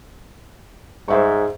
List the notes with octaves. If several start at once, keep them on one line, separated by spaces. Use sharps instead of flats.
G#2 C5 E5 C#6